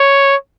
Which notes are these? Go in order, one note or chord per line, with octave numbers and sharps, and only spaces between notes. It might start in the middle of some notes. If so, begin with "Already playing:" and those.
Already playing: C#5